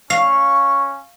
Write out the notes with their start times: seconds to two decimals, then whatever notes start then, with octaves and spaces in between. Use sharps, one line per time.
0.10 C#4 F5 C#6